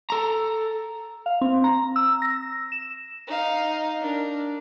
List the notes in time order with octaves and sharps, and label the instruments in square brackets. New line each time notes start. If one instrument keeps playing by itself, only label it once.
[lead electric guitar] A4 A#5
[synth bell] F5
C4
A#5
E6
A#6
E7
[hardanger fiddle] D#4 F5
D4 A#4